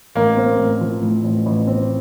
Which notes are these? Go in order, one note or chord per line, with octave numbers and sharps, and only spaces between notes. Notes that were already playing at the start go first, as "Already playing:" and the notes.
A1 A#3
C4
A1
F3
A2
A1
A1
C4